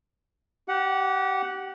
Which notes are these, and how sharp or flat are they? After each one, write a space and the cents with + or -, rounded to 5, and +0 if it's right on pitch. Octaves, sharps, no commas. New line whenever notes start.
G4 -25 F#5 +0